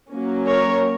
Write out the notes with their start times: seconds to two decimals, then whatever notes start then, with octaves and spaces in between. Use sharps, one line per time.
0.10 F#3 A#3 C#4
0.47 A#4 C#5